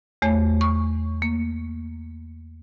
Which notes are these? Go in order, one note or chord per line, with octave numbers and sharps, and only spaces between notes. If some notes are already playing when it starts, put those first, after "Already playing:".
E2 A3 C#5
C#6
A#3